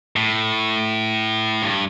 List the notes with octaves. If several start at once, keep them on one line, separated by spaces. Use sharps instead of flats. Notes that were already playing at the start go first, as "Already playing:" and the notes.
A2
G2